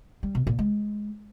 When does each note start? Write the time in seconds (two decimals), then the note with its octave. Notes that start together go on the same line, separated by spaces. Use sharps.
0.23 G3
0.35 B2
0.47 A#2
0.59 G#3